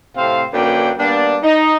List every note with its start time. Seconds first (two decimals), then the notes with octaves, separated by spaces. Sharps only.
0.16 A2 C3 C4 C5 F5
0.52 F#2 D3 A#3 D4 B4 G5
0.98 G3 A#3 B3 D4
1.43 D#4